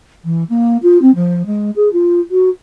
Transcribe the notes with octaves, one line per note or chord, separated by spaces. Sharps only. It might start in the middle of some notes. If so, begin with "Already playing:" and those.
E3
A#3
F4
C4
F3
G#3
G#4
F4
F#4